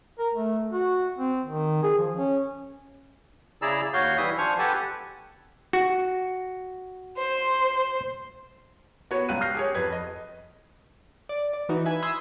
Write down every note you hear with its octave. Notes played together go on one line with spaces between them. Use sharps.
A#4
A3
F#4
C4
D#3
G#4
F3
C#4
C#3 E4 G#4 D5 A#5 E6
D#2 F#4 C#5 F5 G6
E3 G3 E4 E5 D#6
F3 D4 C5 G#5 C#6 F6
G4 A4 B4 F#5 G#5 A5
F#4
C5
B3 F#4 C#5
C#2 G3 F5 F#6 D#7
F6 G6 A#6 C7
G4 G#4 C#5
F2 B4 G#6
D#5
D5
D5
E3 D#4 F#4
B4 E5 G#5
B5 C6 D#6 E6 G#6